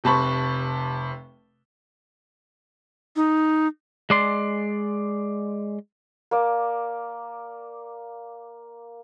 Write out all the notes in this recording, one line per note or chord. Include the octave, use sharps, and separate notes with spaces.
F1 C3 A5 B5 C#6
D#4
G#3 D5 C6
A#3 D5